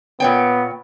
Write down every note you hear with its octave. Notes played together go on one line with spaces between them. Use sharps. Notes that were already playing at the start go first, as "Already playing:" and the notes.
A#2 B3 C#5 G5